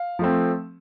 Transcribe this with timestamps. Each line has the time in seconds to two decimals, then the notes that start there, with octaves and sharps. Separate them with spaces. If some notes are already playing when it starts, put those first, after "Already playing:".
Already playing: F5
0.19 F3 A3 C4